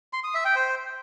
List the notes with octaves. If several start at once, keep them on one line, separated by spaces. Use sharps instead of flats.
C6
D#6
E5
G5
C5